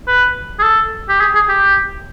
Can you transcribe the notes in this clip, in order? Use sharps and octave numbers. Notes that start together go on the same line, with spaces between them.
B4
G#4
A4
G4
G#4
G#4
G4